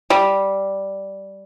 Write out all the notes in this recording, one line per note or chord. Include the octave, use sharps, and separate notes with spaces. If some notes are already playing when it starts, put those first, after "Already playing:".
G3